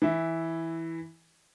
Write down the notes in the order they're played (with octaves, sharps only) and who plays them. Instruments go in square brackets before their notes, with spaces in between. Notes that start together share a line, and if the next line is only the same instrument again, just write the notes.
[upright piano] E3 E4